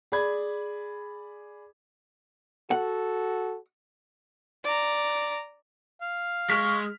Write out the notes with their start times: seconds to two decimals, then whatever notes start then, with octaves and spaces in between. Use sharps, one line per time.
0.12 G#4 D5 B5 G#6
2.71 F#4 A4 F#5
4.64 D5 A#5
6.02 F5
6.50 G#3 C#6 F6 B6